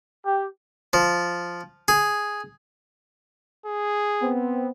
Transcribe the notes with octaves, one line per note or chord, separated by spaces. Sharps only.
G4
F3
G#4
G#4
B3 C4